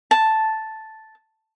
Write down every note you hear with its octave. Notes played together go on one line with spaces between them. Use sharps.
A5